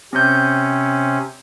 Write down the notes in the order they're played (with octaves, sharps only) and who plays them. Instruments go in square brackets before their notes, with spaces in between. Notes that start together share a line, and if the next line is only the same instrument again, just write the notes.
[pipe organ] C3 C#4 [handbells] C4 G6